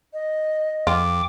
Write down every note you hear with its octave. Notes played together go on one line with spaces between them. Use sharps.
D#5
F2 F4 G5 D6